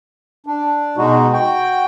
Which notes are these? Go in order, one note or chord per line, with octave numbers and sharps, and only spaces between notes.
D4
B2 G#3 D#4 F#4
F#4 G5